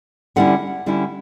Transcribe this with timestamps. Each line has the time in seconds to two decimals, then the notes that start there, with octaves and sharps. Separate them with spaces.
0.36 D3 G3 C#4 E4 F#5
0.86 D3 G3 C#4 E4